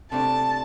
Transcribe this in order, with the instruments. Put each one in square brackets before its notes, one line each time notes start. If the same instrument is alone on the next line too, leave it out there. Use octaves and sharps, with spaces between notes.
[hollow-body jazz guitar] C3 A3 D4 [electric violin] A5